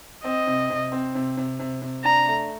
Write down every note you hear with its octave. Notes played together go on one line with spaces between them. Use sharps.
C4 D#5
C3
C3
C4
C3
C3
C3
C3
D4 A#5
A3